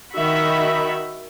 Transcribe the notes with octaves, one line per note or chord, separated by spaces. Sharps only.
D#3 F#4 E5 B5